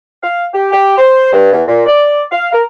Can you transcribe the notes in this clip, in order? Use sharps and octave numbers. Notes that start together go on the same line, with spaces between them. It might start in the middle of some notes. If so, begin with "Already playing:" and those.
F5
G4
G4
C5
G2
E2
A#2
D5
F5
A#4